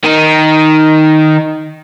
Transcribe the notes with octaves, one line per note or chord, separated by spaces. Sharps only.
D#3 D#4